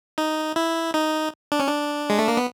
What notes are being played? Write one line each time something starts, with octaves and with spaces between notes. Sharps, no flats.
D#4
E4
D#4
D4
C#4
D4
G#3
A3
A#3
B3